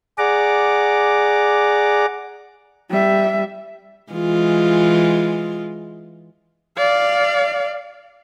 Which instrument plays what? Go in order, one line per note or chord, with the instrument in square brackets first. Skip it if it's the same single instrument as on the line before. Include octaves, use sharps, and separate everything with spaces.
[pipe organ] G#4 D5 F#5 A#5 D6
[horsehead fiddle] G3 E5
[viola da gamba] E3 G#3 F4
[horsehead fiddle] D5 F5